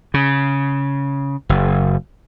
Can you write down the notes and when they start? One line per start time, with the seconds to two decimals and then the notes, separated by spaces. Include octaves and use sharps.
0.14 C#3
1.49 F#1